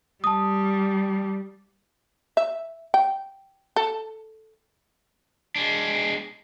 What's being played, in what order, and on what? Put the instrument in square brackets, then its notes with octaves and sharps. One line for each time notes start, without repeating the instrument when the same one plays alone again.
[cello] G3 [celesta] A5 D#6
[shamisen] E5
G5
A4
[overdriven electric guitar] G#3 D4